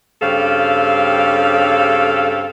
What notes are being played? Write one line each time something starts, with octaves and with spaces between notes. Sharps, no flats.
G2 C#3 C4 A4 F5